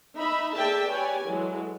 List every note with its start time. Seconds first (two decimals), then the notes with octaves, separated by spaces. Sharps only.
0.19 D#4 E5 B5
0.57 G#4 A4 D5 E5 G5 A5
0.91 G4 B4 C#5 D5 G#5
1.29 E3 F#3 G#3 A4